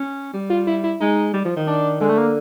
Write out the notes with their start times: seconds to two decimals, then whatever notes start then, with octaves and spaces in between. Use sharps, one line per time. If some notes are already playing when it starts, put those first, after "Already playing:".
Already playing: C#4
0.34 G3
0.50 F4
0.67 E4
0.84 E4
1.00 G#3 D#4
1.33 G3
1.45 F3
1.56 D#3
1.67 D4
2.00 D3 G#3
2.09 A3
2.18 A#3